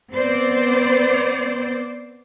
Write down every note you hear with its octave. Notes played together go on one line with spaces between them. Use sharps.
B3 C4 C5 D5